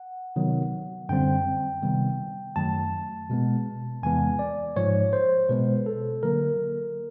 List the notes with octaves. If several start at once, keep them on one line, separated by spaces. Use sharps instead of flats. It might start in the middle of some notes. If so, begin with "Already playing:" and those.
Already playing: F#5
C3 D#3 F#3 B3
F#2 D3 G3 C4 G5
C3 D#3 G3 B3
F#2 D#3 F#3 A3 A5
B2 G#3 B3
E2 C3 E3 G#3 B3 G#5
D5
G#2 F3 G#3 C#5
C5
B2 G#3 B3 B4
A4
D3 F#3 A#3 A#4